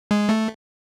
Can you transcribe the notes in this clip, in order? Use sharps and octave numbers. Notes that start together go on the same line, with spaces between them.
G#3
A3